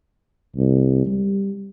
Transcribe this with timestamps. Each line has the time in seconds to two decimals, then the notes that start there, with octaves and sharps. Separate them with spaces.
0.56 C2
1.06 G3